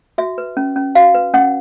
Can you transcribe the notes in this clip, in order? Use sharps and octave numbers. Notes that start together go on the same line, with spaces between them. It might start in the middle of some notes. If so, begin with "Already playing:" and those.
F#4 E5
B4
C#4
C#4
F#4 F5
B4
C#4 F#5